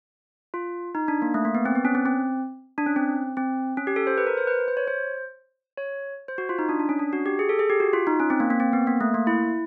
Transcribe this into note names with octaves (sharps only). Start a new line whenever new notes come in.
F4
D#4
D4
A#3
A3
A#3
B3
C4
B3
C#4
C4
C4
D4
C#4
C4
C4
C#4
G4
A4
C5
B4
A#4
C5
B4
C5
C#5
C5
C#5
C5
F#4
F4
D#4
D4
D4
C#4
D4
F#4
G4
G#4
A4
G#4
G4
F#4
F4
D#4
C#4
C4
A#3
A#3
C4
B3
A#3
A3
A#3
E4